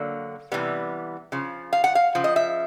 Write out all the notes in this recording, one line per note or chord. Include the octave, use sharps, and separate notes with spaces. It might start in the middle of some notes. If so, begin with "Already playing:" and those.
Already playing: D3 F#3 A#3
C3 E3 G3 B3
C#3 F3
F5
F#5
F5
C#3 F3
D#5
E5